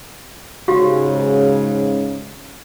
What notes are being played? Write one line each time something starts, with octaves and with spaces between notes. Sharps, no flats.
G#2 C#3 F#4 G4 F5